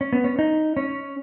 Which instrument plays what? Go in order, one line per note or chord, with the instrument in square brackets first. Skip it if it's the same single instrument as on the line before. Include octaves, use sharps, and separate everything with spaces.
[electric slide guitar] C#4
B3
C#4
D#4
C#4